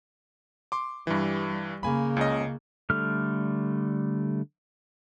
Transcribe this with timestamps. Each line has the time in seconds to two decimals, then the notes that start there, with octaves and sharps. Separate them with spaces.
0.72 C6 D6
1.07 G2 E3 G3
1.83 C#3 A#3 G#5 B5
2.17 C#2 C#4 D#5
2.90 D3 G3 A3 F6